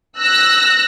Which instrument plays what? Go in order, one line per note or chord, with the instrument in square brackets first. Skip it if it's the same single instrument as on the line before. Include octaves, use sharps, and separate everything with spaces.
[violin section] E6 F#6 A#6